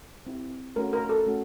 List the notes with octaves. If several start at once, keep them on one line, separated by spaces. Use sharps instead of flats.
C4 E4 G4
A3 C#4 F#4 A#4
A#4
A4
A3 C#4 F#4